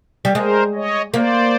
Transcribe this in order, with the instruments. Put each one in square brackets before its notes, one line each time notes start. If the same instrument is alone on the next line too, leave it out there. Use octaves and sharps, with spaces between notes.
[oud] G3
[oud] G#3 [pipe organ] A#4 C5
[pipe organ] C#5 D#5
[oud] A#3 [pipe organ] C5 D5